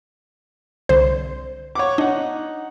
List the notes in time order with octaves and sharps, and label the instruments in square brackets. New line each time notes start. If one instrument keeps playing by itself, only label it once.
[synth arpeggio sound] C2 D3 [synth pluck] C5
[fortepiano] C#5 F#5 D6
[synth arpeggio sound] D4 [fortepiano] D#4 F#5